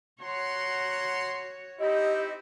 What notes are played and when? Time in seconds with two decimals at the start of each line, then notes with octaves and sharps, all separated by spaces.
0.21 F#4 C#5 F#5 A#5 C6
1.79 C4 D#4 E4 G4 D#5